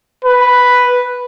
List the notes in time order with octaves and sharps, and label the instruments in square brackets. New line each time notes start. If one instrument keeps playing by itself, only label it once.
[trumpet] B4